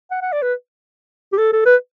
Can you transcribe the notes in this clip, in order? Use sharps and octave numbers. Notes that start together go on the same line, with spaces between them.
F#5
F#5
D5
B4
G4
A4
A4
B4